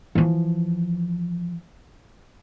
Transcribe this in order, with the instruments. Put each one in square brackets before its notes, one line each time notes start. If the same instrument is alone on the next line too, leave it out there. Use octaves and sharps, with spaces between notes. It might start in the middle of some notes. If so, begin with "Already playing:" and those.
[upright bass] E3 F3